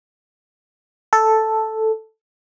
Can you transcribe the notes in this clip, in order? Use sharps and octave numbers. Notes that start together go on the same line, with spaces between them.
A4